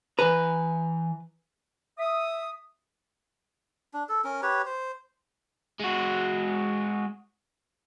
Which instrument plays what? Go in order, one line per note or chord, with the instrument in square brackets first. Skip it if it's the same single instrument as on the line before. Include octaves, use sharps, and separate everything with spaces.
[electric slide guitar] E3 G#5 A#5 [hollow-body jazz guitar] B4
[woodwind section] E5 D#6
[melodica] D4
A4
C#4 A#4
G4 B4 C#5
C5
[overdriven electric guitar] G#3 F#4